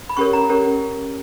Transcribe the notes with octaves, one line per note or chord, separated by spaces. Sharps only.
B5
C#4 G4 A#4 C#5 C#6
A#5
C#4 G4 A#4 C#5